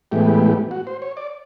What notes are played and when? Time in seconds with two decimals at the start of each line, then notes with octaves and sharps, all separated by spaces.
0.12 A2 E3 G#3 B3 G4
0.71 F#4
0.87 C5
1.02 C#5
1.17 D5